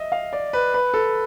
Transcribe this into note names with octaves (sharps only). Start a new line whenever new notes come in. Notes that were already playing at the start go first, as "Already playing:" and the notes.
Already playing: D#5 E5
F5
D5
B4
B4
A4